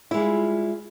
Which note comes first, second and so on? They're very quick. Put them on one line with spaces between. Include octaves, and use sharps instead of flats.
E4 G#3 G3 F4